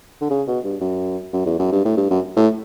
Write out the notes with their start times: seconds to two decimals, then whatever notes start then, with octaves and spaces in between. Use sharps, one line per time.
0.21 D3
0.30 C#3
0.47 B2
0.64 G2
0.81 F#2
1.33 F#2
1.46 E2
1.59 F#2
1.72 G2
1.85 A2
1.97 G2
2.10 F#2
2.36 A2